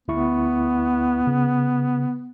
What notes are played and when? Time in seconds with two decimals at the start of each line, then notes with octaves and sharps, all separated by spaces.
0.08 D2 B3 E4 C#6
1.27 C#3